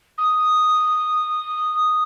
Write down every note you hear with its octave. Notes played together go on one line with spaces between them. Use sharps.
D#6